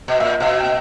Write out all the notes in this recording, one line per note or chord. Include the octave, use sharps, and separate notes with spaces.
B2
A#2 E5
B2 F5
G5